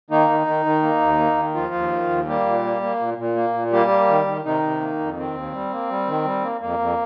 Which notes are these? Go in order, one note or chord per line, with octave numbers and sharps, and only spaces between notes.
D#3 A#3 D#4
D#3
D#3
D#3
A#3
D#2
A#3
D#3
D#2 F3 F4
D#2
D#3
D#2
G3 A#3 G4
A#2
A#3
A#3
A#2
A#2
A#3
A#2
G3 A#3 G4
A#3
D#3
D#3
C3 D#3 D#4
C3
A#3
F2
D#3 C4
D#2
G3
A#3
G3
D#3
G3
A#3
F2 A#3
F2